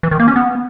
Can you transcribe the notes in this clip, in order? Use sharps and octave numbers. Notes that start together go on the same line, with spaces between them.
E3
D#3
A#3
C#4
B3